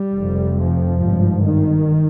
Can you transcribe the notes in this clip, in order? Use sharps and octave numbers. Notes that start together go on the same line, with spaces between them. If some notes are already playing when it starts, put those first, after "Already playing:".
Already playing: G3
F1 F2 C3
F3
G#1 G2
D#3